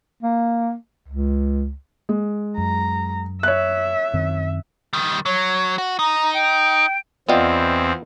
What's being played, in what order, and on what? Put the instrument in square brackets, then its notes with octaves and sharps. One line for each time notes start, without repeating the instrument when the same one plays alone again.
[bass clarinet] A#3
C#2
[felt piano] G#3
[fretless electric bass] F#2 [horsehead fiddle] A#5
[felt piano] C#5 F#6 [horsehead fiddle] E5
[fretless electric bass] F#2 D#3 C4
[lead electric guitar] D#3 G3
[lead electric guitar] F#3 [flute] C#5
[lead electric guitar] F#4
[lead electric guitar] D#4 [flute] A#5
[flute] G5
[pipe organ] E2 C4 [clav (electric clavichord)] B3 F4 [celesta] D5 D#5 G5